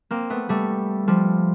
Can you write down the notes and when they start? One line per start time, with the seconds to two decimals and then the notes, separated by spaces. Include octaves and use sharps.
0.11 A#3 C4
0.30 A3 B3
0.49 G3 A3
1.08 F3 G3